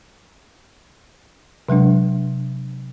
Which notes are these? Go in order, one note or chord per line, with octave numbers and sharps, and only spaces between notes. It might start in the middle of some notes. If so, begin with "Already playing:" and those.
C3 F#3 G#3 D4